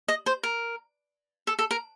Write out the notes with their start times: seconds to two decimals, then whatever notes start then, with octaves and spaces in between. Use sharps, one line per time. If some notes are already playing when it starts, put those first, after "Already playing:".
0.08 D#5
0.26 C5
0.43 A#4
1.47 A4
1.59 A4
1.71 A#4